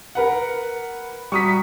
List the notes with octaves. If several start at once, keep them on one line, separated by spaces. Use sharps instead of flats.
A#4 B4 F#5
G3 F#4 A#5 C#6 D#6 B6